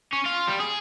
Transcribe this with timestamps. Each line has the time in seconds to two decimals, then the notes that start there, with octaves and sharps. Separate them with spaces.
0.13 C#4
0.25 F4
0.47 G3
0.59 G#4